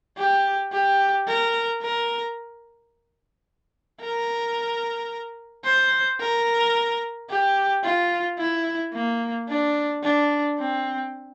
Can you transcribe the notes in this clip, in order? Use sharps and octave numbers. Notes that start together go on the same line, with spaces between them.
G4
G4
A#4
A#4
A#4
C5
A#4
G4
F4
E4
A#3
D4
D4
C4